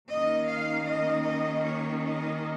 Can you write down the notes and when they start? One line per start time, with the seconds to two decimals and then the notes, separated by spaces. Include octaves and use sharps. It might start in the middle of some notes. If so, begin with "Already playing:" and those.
0.11 D#2 D#3 A#3 C#4 D#5
0.50 F5
0.89 D#5
1.27 D#5
1.66 C#5
2.05 D#5